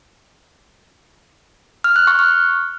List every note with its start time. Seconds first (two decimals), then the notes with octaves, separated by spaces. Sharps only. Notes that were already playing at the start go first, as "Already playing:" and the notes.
1.84 F6
1.96 F#6
2.07 C#6
2.19 F6